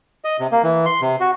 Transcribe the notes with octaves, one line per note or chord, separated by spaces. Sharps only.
D#5
C3
A#3
E3
C6
C3
F#4